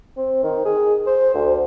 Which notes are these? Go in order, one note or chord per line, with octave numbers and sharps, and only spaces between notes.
C4
D#3
G#4
C5
D2